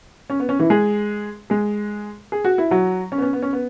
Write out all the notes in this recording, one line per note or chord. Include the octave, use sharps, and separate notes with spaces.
C#4
B3
C#4
E3 E4
G#3 G#4
G#3 G#4
G#4
F#4
E4
F#3 F#4
C#4
B3
C#4
B3
C#4
B3